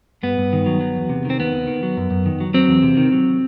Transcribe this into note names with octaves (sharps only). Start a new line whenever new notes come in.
G2 B3
G2
D#3
F#3
F#3
E2
C3
D#3
C4
D#2 B3
D#2
D#3
F#3
F#2
F#2
D#3
F#3
F#3 C4
E2
C3
D#3
F#3